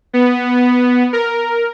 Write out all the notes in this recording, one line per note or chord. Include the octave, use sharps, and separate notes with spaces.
B3
A#4